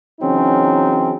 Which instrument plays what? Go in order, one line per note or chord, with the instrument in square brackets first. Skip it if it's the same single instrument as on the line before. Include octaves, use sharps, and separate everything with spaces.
[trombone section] C#3 E3 F#3 C4 C#4 D#4